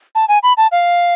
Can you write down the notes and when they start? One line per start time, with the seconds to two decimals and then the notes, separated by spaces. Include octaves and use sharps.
0.15 A5
0.28 G#5
0.43 B5
0.57 A5
0.72 F5